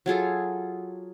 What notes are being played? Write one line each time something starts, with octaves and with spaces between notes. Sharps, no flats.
F#3 F4 G#4 A4